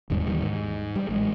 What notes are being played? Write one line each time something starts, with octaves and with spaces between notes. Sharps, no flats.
E1 D#2 G#2 G3
D#2 D#3 E3 G3
G#2
G3
A1 G#3